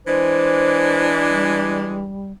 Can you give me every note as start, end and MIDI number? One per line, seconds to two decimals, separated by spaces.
0.06 2.12 52
0.06 2.12 56
0.06 2.12 62
0.06 1.07 72
1.30 2.32 55